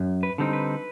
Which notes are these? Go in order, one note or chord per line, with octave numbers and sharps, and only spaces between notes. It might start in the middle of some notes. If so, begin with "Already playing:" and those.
Already playing: F#2
B4
D3 G3 C4 D#4
B4